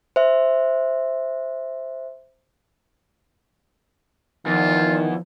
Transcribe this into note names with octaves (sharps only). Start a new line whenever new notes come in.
C5 E5
E2 D#3 F3 F4